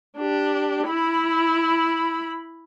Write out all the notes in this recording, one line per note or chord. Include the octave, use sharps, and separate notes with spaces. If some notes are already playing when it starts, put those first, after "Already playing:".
D4 G4
E4 B5